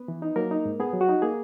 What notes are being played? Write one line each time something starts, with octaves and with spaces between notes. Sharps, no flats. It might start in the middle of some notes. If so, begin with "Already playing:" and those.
Already playing: B3 B4
E3
D#4
F#3 A#3 A#4
D#4
G#2
B3 G#4
F#3
F#4
D#4
A#3 G#4